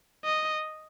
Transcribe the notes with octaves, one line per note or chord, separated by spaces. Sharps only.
D#5